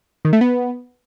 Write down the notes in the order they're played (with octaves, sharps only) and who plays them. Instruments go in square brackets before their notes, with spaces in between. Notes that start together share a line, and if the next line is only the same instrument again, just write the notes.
[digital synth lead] D#3
A3
B3